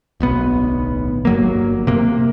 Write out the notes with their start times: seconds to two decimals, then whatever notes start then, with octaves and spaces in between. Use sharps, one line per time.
0.20 D1 B1 B3
1.25 G1 F#3 A#3
1.87 C3 A#3